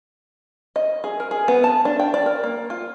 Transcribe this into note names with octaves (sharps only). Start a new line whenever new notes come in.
D#5
G#4
A#4
G#4
B3
A5
D4
G5
D5
A#4
A#3
F4